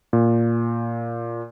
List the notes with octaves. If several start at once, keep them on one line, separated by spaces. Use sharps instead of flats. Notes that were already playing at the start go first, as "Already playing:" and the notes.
A#2